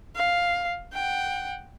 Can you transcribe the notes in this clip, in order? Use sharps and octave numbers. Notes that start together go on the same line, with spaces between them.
F5
F#5 G5